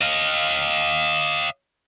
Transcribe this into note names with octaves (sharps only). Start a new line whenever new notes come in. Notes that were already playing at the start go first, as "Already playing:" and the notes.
D#5 F5